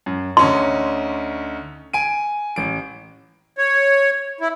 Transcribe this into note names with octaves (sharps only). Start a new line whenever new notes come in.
F#2
D2 C#4 D#4 C6
G#5 D7 D#7
A1 D7
C#5
E4